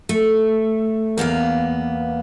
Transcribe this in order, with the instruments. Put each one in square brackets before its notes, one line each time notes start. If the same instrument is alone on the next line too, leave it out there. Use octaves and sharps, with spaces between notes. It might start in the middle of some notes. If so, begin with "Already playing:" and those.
[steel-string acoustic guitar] A3
E2 A#3 B3 F5